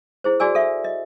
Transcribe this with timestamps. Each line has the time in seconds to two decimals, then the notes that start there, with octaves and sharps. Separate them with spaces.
0.24 E4 G#4 C5
0.40 F#4 G#4 D5 G#5 E6
0.55 A4 E5
0.84 D#5